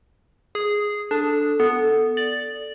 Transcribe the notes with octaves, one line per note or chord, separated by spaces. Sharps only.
G#4
D4 A4 A5 D#6
B3 A4
D5